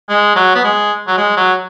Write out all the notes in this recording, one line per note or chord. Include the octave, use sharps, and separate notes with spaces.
G#3
F#3
B3
G#3
F#3
G#3
F#3